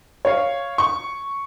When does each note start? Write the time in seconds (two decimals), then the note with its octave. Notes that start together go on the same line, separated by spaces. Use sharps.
0.25 C#5 F5
0.78 C#6